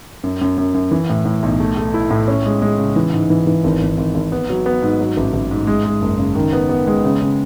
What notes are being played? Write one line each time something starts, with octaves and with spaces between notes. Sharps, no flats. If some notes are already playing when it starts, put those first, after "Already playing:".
F#2
F#2
F#2
F#2
E3
A2
A2
B1
A3
A3
E4
A2
C#4
G#3
G#3
C#3
E3
G#2
E3
E3
G#1
G#1
G#1
G#1
B3
F#3
B3
G#2
F#3
A1
A1
G#2
G#3
G#3
F#1
C#3
D#3
B3
B3
G#3
C#3
C#3